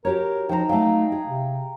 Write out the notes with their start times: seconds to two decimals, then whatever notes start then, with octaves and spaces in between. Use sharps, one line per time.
0.05 F#4 G4 A#4 C#5
0.49 F3 D#4 C5 G5 A#5
0.69 F#3 A3 F5 G5
1.12 G#4
1.27 C3